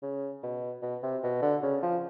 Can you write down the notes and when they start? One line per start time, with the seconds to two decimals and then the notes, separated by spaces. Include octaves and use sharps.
0.03 C#3
0.43 B2
0.82 B2
1.03 C3
1.23 B2
1.42 D3
1.63 C#3
1.83 F3